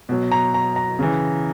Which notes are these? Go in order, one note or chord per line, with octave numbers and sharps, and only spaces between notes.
B2 F#3
A#5
A#5
A#5
C#3 E3